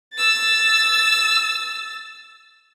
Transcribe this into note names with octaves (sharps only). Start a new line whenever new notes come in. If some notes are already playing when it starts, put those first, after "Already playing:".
E6 A6